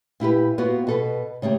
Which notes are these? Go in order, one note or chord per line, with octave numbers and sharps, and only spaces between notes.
A#2 E4 G4 B4
A#3 B3 F4 F#4
B2 A4 B4
C#3 A3 A#3 G4